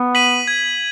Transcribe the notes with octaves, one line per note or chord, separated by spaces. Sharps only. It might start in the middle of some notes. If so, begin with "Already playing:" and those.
Already playing: B3
B6 D#7 F#7
G#6